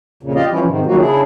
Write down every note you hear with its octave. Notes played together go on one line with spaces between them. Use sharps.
F2 A#2 C#3
F4 G4 D5 D#5 F5
E3 F3 G3 C#4 E4 F4
G#2 C3 D#3
D#3 F#3 G3 A#3 F4 F#4
C#3 D4 E4 G#4